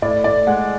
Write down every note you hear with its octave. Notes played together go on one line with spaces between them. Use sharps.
A2 D5
A2 D5
G#3 F#5